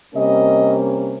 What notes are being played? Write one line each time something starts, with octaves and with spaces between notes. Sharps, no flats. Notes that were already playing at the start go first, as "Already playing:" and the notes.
C3 G3 A#3 C#4 D#5